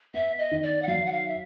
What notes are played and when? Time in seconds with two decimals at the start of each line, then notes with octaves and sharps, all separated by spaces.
0.14 B3 E5
0.39 D#5
0.51 D#3
0.63 D5
0.82 F#5
0.88 F#3 F5
1.06 F#5
1.12 F5
1.28 E5